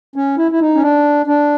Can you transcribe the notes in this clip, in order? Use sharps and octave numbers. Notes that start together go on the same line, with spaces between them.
C#4
E4
E4
D#4
C#4
D4
D4